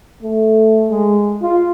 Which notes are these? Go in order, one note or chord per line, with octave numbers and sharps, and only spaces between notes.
A3
G#3
F4